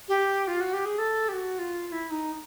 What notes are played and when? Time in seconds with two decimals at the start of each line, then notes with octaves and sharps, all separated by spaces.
0.09 G4
0.48 F4
0.61 F#4
0.73 G4
0.85 G#4
0.98 A4
1.28 G4
1.33 F#4
1.59 F4
1.88 F4
1.92 E4
2.11 D#4